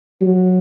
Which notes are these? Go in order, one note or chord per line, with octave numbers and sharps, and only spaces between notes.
F#3